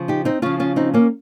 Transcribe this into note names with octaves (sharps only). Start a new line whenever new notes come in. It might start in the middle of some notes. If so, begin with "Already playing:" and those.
Already playing: C#3 F3
D#4 G4
C4 D#4
C#3 F3 C#4 F4
C#4 F4
C4 D#4
A#3 C#4